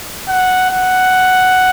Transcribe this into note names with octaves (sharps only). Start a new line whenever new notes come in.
F#5
F#5